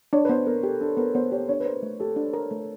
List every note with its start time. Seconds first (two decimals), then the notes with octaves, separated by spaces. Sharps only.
0.13 D4 C#5
0.25 B4
0.29 B3 C5
0.47 B3 A#4
0.63 G4 A4
0.80 D4 A4
0.97 B3 A#4
1.15 B3 C5
1.32 G4 C#5
1.49 D4 C#5
1.60 B4
1.65 A#4 C5
1.82 A3
2.00 G4 A4
2.16 D4
2.34 A#4
2.51 A3